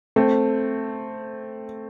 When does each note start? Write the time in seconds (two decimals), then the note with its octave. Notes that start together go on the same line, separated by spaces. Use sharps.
0.16 A3 C4